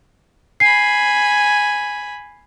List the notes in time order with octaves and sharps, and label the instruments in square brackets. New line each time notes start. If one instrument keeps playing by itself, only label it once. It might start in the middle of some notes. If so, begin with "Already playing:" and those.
[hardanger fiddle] G#5 B5 [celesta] C7